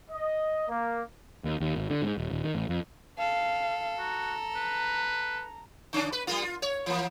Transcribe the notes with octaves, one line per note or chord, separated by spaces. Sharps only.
D#5
A#3
D#2
D#2
G#1
D3
G#2
D#1
D#1
D#3
A1
F2
A4 F5
F#4 A#5
B4
D3 C#4 D4
B4
G3 A#3 F4
F4
C#5
E3 A#3